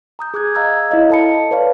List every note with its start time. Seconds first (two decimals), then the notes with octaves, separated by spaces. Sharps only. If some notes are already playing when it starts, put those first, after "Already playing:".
0.19 A#5 D#6 G6
0.34 G#4 D6 F#6 G#6
0.55 D#5 F5 A#5 E6 G#6
0.91 E4 C#5 D#5 F5
1.10 A4 D#5 A5 B5 C#7
1.51 B4 C#5 D5 F5